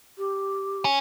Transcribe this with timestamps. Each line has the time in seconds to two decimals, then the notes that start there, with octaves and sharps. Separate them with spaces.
0.18 G4
0.85 C#4